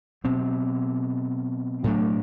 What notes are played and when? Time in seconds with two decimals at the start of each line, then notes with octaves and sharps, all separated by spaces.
0.24 B2 F#3 C4
1.84 A2 F#3 A3 D4